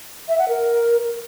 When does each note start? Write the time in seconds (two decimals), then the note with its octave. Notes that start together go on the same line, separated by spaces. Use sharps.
0.29 E5
0.39 F#5
0.49 A#4